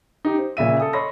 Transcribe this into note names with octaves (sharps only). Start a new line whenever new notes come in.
D#4 G4
C5
A#2 C#3 E5 D#7
A4 D#6
C#5 D#5 B5 C6 A#6